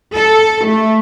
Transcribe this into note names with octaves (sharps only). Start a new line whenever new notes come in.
A4
A3